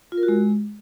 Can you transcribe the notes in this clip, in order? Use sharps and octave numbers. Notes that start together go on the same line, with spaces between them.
F4
A#4
F#4
G#3